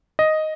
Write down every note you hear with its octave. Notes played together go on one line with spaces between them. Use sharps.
D#5